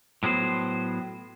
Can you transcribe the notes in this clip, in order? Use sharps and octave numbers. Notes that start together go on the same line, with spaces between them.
A2 F#3 B3 C5